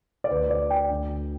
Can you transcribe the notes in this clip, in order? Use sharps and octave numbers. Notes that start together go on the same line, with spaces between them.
D5
D2 D3 B4
D5
G5
D2 D3